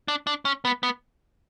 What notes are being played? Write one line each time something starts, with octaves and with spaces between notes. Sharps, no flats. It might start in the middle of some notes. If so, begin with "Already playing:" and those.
D4
D4
C#4
B3
B3